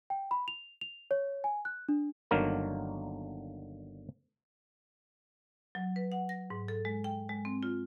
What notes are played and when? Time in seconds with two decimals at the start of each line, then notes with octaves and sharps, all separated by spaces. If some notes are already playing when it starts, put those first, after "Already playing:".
0.10 G5
0.31 B5
0.48 F7
0.81 F7
1.11 C#5
1.44 G#5
1.65 F#6
1.89 D4
2.31 G1 D3 D#3 F#3 A#3 A#4
5.75 F#3
5.96 B4
6.12 F#5
6.29 A#6
6.50 G#2
6.68 A4
6.85 G#3
7.04 G5
7.29 G#3
7.45 C4
7.63 F4